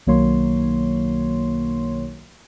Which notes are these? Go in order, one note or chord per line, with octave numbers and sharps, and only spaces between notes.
B1 D#3 F#3 A#3 C#5 C6